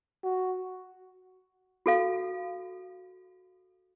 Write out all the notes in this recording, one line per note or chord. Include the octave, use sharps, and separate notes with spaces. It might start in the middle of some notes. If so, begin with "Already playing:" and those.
F#4
F#4 A4 F5